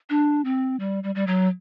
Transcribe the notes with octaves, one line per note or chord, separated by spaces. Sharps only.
D4
C4
G3
G3
G3
F#3